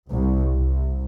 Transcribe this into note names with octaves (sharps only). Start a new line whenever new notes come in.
C2
C2